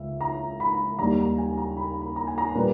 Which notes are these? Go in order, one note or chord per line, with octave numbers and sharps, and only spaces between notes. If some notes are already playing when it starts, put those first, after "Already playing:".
Already playing: C#2 C#3 E5
A#5
B5
D#2 D#3 G3 A#5
A#5
G#5
A#5
B5
B5
A#5
G#5
A#5
A#2 G3 A#3 B4